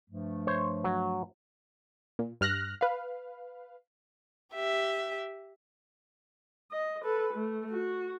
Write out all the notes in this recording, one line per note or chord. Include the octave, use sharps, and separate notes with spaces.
G2 F3 A3
C5 C#5
F#3
A#2
G2 F6 F#6 A#6
B4 F5
G4 E5
D#5
A4 B4
A3
F#4